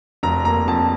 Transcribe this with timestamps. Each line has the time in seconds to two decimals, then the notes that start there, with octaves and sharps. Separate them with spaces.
0.23 F1 A#5
0.45 A#3 A#5
0.68 F2 A5